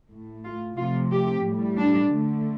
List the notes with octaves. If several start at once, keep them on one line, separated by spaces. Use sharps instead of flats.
A2 A3
F4
C3 F3 A3 F4
G4
A2 G3
D4
D3 A3